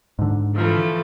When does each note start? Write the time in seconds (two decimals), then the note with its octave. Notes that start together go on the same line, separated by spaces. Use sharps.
0.19 G#2 D3
0.55 E3 F3 A3